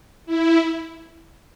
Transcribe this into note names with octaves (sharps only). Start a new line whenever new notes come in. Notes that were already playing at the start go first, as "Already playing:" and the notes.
E4